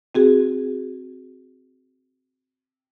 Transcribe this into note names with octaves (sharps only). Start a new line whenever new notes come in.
C4 F#4 G#4